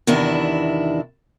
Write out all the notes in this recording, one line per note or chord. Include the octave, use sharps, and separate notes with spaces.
E2 C3 D#3 D4 E4